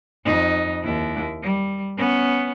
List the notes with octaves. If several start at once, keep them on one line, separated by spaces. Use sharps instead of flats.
F2 D#4
D#2 E4
G3
B3 C#4